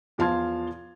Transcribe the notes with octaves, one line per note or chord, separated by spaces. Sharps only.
E2 F3 F5 A5 C6 G#6